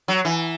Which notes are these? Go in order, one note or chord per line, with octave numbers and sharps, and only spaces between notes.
F#3
E3